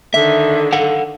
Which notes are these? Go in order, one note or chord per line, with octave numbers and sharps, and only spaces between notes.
D3 D#3 E5
A4 F5 F#5